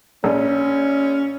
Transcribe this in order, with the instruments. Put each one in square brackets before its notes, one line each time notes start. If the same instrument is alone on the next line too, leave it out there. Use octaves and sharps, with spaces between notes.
[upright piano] A#1 [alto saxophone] C#4